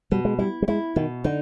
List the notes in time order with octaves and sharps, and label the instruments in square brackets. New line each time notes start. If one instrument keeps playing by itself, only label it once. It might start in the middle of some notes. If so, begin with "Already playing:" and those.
[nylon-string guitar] B2 [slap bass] G3
[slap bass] G#3
[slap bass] G3 [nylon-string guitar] E4
[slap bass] G3
[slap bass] G#3 [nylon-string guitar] E4
[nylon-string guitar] B2 [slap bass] D#3
[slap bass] D3 [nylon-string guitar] D#4